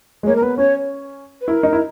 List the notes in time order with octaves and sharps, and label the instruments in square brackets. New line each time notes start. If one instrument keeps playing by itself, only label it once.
[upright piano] G#3
[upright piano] A#3 [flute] C#5
[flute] A#4
[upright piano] B3 [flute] B4
[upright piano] C#4 [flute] C#5
[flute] B4
[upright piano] E4 [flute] A#4
[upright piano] D#4
E4